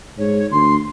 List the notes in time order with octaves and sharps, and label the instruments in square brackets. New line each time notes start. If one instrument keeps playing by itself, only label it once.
[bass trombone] G#2 [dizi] C#5
[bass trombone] D2 [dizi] C6